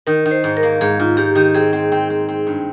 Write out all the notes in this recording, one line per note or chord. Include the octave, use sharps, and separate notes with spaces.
D#3 A#4
D#3
C5
G#2
A#4
A#3
G#2 G#4
G#2 F4
G#2 G4
D#3 G4
C4 G#4
C4
C4
C4
C4
G2